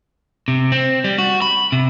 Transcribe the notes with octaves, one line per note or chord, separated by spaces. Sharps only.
C3
C4
G3
F#4
B5
C3